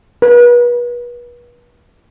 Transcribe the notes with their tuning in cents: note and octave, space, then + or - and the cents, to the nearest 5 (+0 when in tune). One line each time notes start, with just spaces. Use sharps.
B4 -35